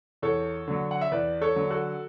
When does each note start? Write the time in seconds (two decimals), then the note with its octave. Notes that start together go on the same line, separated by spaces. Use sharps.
0.22 E2 A4 C#5
0.68 D3 F#3
0.91 F#5
1.01 E5
1.12 E2 B4 D5
1.41 A4 C#5
1.56 D3 F#3
1.71 F#4 A4